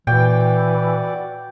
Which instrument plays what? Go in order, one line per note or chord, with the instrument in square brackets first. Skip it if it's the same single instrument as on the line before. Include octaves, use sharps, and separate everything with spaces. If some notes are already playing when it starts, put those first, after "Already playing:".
[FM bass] A#2 [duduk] E3 [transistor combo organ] F#4 D5 [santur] G5